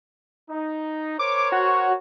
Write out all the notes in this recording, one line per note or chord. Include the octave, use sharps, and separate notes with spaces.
D#4
A#4 C5 C#5 D6
F#4